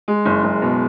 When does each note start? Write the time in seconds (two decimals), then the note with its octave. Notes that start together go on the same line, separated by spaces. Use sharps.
0.08 G#3
0.26 F#1
0.43 F#1
0.62 B2